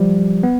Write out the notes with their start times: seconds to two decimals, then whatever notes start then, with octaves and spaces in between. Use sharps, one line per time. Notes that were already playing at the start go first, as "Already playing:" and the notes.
Already playing: F3 G3
0.43 B3